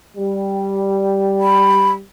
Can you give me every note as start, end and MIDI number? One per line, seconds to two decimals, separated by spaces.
0.17 2.03 55
1.41 1.91 83